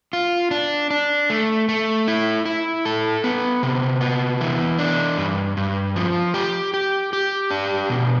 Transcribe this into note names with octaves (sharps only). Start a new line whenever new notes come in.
F4
D4
D4
A3
A3
E4
E4
A4
B3
C3
B3
E3
D4
G2
G2
F3
G4
G4
G4
D4
B2